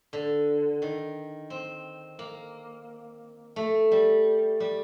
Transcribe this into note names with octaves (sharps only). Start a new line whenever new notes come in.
D3
D#3
C4
A#3
A3
G3
G3